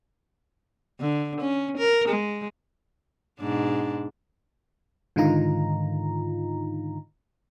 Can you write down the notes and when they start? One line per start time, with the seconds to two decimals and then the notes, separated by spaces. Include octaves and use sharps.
1.00 D3
1.41 C#4
1.78 A#4
2.08 G#3
3.40 G#2 B2 D4
5.16 G#2 D3 D#3 D#4 F4 A#5